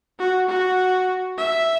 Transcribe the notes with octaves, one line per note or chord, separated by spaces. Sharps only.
F#4
F#4
E5